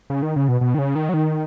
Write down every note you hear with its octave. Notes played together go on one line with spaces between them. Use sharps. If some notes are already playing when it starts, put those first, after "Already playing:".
C#3
D#3
C#3
B2
B2
D#3
C#3
D#3
F#3
D#3